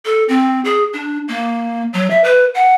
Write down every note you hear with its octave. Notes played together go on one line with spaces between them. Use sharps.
A4
C4
G#4
D4
A#3
F#3
E5
B4
F#5